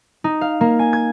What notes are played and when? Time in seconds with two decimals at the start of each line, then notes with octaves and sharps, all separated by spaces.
0.24 D#4
0.41 F5
0.61 A#3
0.79 G#5
0.93 G#6